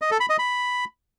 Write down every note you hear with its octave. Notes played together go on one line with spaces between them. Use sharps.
D#5
A4
B5
D#5
B5